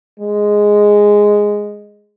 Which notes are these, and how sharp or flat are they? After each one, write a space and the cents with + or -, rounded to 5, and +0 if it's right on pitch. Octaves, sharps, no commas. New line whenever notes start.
G#3 -5